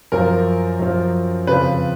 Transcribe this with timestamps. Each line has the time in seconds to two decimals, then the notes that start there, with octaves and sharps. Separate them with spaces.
0.12 F#2 F3 A#4
0.79 F#2 F3
1.47 F2 C#3 F3 B4